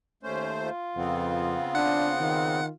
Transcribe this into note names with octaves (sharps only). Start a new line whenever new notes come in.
D#2 A3 C#4 C5
F4
F2 C#3 B3 C4
D4 F#5
D#3